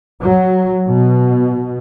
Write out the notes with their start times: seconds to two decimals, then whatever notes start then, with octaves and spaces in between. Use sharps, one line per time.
0.21 F#3
0.87 B2